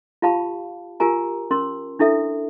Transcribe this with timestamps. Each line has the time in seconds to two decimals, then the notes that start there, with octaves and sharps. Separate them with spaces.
0.22 F4 G4 F5 A5 B5
1.00 F4 G4 A#4 G#5 A#5
1.51 C#4 A#4 C6
1.99 D4 E4 A4 E5